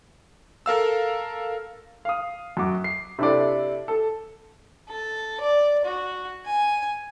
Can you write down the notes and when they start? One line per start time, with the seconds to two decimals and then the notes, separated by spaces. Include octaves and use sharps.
0.66 A4 A#4 F5 E6
2.05 F5 D#6
2.57 F#2 F#4 D6
2.84 C7
3.19 C3 D4 E4 A4 D5
3.88 A4
4.89 A4
5.41 D5
5.85 F#4
6.45 G#5